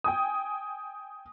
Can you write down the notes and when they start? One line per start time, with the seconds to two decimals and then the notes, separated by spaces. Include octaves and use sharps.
0.04 G5 G#5 D#6